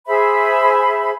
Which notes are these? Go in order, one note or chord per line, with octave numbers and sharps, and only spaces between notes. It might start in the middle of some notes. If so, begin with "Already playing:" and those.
G#4 C5 E5 B5